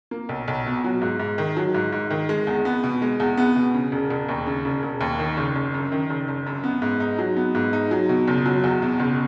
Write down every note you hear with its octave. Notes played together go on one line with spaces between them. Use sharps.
A#3
B1
B1
B2
F#3
G#2
G#2
D#3
F#3
G#2
G#2
D#3
G#3
E2
B3
B2
G#3
E2
B3
B2
C#3
E1
E1
D#2
C#3
E1
E1
D#2
D#3
F#1
F#1
F#2
D#3
F#1
F#1
F#2
B3
G#2
D#4
F#3
B3
G#2
D#4
F#3
B2
F#1
F#3
E2
B2
F#1